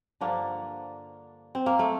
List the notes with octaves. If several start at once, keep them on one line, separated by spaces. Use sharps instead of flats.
G2 D3 F3 A#3 D4
C4
A#3
A3